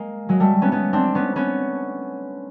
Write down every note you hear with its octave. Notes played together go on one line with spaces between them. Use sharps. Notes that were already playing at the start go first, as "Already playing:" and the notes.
Already playing: G#3 A#3
F#3 G#3
G3 A3
B3 C#4
B3 C#4
C4 D4
B3 C#4
B3 C#4